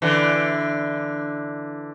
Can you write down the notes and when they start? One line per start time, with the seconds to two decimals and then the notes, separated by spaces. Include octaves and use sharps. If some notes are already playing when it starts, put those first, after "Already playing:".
0.02 D3 E3